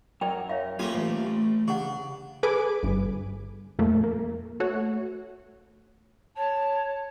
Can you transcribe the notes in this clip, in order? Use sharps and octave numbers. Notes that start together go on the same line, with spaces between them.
F#2 A#4 D5 G5
C#5 E5 F5
A3 A#3 F4 G4 D#5 G#5
A1
A3
C#3 D4 G4 F#5
G#4 A4 B4 G#5 D6
G1 G2
F2 A#2 A3 A#3
A#3
A3 F#4 C#5
C#5 A5